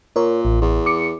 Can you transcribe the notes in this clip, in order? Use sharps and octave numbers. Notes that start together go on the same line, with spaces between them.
A#2 A#4 C#5
A1
E2
D6 C#7